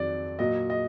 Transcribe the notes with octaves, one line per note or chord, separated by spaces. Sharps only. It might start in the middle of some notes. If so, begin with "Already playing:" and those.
Already playing: F2 D#3 F#3 D5
A#2 F#3 D#5
D#5